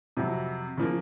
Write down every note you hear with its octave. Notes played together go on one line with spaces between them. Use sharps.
F2 C3 F#3
C#3 F3 A#3